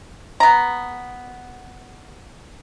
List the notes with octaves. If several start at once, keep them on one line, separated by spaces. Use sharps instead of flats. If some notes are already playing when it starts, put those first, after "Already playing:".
B3 A#5